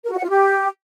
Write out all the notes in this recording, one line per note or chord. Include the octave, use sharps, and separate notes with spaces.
A#4
F#4
F#5
F4
G4